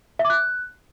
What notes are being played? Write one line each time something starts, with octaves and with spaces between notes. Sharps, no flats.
E5
D6
F#6